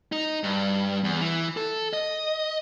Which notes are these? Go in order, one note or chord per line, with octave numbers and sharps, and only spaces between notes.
D#4
G2
E2
E3
A4
D#5